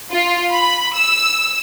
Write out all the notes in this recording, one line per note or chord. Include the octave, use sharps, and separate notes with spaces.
F4
B5
E6